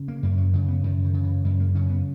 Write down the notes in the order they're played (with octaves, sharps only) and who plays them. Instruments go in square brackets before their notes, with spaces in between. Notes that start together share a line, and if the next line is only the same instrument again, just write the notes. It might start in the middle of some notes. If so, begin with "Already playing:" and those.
Already playing: [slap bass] C#3
A#3
F#2 A#3
F#3
C#3 G#3
B3
F#2 D#3
D#3
C#3
E3
F#2 G#3
A#3
C#3 C#4
B3